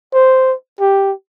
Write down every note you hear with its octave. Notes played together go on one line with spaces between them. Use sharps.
C5
G4